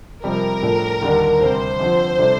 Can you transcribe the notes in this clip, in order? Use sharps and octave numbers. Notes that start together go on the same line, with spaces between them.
F2 C3 G3 A#4
A2 F3 A3 D4
D#2 D3 G3 D4
D2 C3 G3 C5
F2 D3 F3
C3 G3 D4 A4